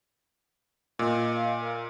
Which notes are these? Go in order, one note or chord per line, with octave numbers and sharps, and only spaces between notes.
A#2 D#5
F5
A#4